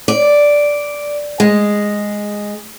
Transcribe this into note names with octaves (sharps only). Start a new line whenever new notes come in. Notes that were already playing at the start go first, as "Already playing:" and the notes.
D5
G#3